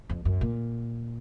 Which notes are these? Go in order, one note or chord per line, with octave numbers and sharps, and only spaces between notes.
F2
F#2
A#2